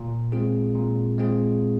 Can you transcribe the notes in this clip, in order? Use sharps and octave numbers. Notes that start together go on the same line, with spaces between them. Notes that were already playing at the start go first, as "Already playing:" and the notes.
Already playing: A#2
G#3 C4 F4 G#4
A#2
G#3 C4 F4 G#4